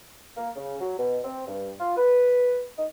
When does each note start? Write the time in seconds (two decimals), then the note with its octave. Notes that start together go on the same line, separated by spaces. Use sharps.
0.37 A#3
0.56 C#3
0.81 F#3
0.98 B2
1.24 C4
1.47 G2
1.80 F4
1.97 B4
2.77 D#4